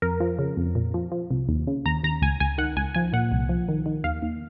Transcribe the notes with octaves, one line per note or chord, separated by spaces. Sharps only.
F2 A#4
F3
C#3
F2
A#2
F3
F3
C2
D#2
C#3
D#2 A#5
D#2 A#5
C#2 G#5
C#2 G#5
D#3 F#5
C#2 G#5
F3 G#5
A#2 F#5
C2
F3
D#3
D#3
D#2 F5
D#2